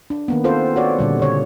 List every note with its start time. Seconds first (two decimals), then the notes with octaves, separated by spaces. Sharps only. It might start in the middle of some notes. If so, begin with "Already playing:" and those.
0.10 D4
0.28 D#3 A#3 B3
0.44 C4 F4 A4 C5
0.76 F#4 C#5 D5
0.99 A#2 D3 G3
1.19 C#3 C#5